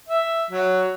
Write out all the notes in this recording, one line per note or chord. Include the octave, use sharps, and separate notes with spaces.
E5
F#3